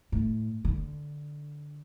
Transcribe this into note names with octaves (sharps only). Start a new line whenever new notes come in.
A2
D3